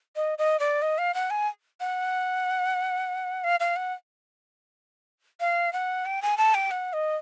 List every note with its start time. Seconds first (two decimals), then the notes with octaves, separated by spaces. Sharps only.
0.16 D#5
0.38 D#5
0.59 D5
0.82 D#5
0.98 F5
1.14 F#5
1.30 G#5
1.80 F#5
3.44 F5
3.60 F5
3.76 F#5
5.40 F5
5.73 F#5
6.06 G5
6.22 G#5
6.37 A5
6.54 G5
6.71 F#5
6.93 D#5